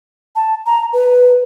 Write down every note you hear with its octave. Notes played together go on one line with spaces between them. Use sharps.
A5
A#5
B4